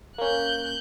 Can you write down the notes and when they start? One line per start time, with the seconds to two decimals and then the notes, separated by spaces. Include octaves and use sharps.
0.18 A#3 C#4 F#6 G6